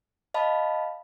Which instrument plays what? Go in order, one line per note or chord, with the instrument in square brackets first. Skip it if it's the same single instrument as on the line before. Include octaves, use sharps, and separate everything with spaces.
[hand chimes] D#5 F5 A5 B5